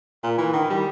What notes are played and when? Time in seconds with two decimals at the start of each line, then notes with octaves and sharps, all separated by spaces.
0.23 A#2
0.38 E3
0.53 D#3
0.70 G3